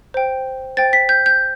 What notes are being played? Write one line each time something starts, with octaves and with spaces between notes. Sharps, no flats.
C5 G5
C5 G5 A6
B6
G6
G6